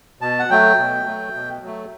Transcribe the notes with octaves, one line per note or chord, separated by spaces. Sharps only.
B2 A5
F#5
F#3 A3 G5
B2
F#3 A3
B2
F#3 A3